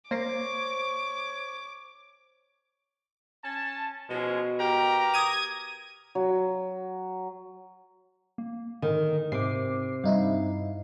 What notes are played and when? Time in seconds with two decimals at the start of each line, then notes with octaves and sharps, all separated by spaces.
0.11 A#3 C5 C#5 D6 A#6 C7
3.43 C#4 A5
4.09 B2 F3 G#3 C#4
4.59 G4 A#4 A#5
5.14 D#6 G#6 D#7
6.15 F#3
8.38 A#3
8.82 D3 D#3
9.32 G#2 C3 D6 C7
10.04 G2 D#4 E4 F5